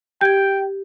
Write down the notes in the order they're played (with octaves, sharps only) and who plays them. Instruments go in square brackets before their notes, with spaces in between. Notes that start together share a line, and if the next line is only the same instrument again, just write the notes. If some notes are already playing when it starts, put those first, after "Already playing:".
[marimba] G4 G#6 [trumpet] G5